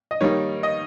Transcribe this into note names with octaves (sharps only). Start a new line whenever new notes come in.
D#5
D#3 G3 A#3 D#4 C#5
D#5